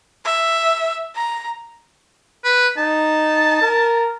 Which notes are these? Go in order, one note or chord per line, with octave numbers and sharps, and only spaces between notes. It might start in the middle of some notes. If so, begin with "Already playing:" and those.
E5
A#5
B4
D#4 A5
A#4